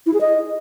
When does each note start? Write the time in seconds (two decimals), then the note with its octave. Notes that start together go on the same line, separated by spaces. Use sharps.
0.06 E4
0.14 G#4
0.21 D#5